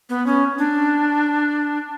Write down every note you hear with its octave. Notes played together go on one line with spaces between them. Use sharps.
B3
C#4
D4